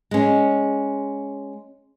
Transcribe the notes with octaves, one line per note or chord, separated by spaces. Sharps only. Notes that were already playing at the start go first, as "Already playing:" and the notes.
G#3 C#4